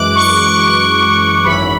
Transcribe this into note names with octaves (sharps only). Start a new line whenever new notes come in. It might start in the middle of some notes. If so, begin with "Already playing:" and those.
Already playing: F#2 E3 G#3 D6 F#6
C#6
G#1 F#2 E3 B5